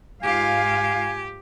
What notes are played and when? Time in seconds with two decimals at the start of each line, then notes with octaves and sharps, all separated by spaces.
0.23 G#2 F4 G4 F5 G#5